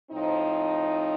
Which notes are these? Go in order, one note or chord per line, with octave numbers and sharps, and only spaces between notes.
A2 F3 C4 D#4